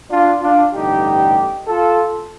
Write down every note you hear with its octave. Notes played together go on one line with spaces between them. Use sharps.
D4 F4
D4 F4
A1 G2 D3 D#4 G4
F4 A4